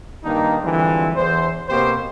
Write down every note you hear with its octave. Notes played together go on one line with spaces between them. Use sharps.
G2 D#3 A#3 D4 D#4
D3 E3 F3 G3 G#3 C4
E2 C5
B2 A#3 C4 G4 C5